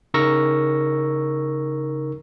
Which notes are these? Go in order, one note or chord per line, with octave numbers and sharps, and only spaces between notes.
C#3 D#4 A#4 C#6 E6 A#6